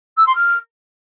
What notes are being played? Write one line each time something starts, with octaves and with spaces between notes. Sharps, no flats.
E6
C6
F6